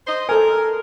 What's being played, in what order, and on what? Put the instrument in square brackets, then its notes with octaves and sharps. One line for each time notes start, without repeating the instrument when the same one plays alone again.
[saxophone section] C5 D#5
[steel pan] A4 G#5 [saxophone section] A#4